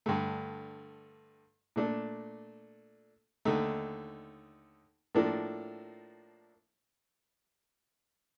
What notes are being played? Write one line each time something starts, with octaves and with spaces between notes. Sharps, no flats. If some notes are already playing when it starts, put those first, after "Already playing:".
G2 D3 A3
A#2 A3 D4 A4
D#2 D3 A3 D#4
A2 F3 A#3 D4 A4